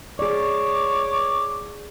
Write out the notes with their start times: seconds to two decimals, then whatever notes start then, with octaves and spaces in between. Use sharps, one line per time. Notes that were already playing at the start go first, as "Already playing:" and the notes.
0.19 G#4 C#5 D5 D6